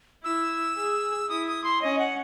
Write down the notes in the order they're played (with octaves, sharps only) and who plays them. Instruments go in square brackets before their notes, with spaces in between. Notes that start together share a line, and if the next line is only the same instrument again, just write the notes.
[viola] E4 [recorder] E6
[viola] G#4
[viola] E4 [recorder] D#6
[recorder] D#6
C6
[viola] C#4 [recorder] D#5
[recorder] F#5